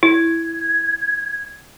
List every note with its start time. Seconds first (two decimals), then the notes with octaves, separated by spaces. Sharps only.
0.03 E4 G#6